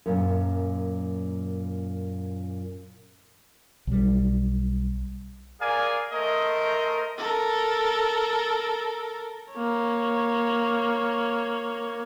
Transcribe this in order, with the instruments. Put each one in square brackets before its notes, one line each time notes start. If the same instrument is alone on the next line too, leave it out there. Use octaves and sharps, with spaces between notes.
[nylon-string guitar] F#2 A#2
[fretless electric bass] B1 G3
[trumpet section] G#4 A#4 D5 F5 G#5
A3 A#4 C5 D#5
[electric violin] A4 A#4
A#3 C#5